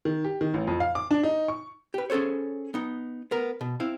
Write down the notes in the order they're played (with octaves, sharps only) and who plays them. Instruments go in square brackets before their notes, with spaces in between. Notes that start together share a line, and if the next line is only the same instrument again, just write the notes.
[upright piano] D#3
G4
D#3
A1
F2
F5
D6
D4
D#4
C#6
[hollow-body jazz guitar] G4 B4
C#4 G#4 A4 C5 C#5
B3 D#4
B3 A#4
B2
C4 E4 F5